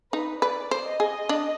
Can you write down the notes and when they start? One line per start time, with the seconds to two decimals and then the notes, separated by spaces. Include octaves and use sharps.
0.12 D#4 B4
0.41 B4 D5
0.71 C5
0.85 D#5
1.00 G#4
1.29 D4